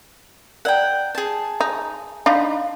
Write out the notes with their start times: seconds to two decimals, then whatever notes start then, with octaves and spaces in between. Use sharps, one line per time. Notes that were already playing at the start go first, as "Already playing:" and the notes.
0.65 A#4 D5 F#5 G5 A#5
1.15 G#4 A5
1.60 D#4
2.26 D4 D#4 F5 B5 C6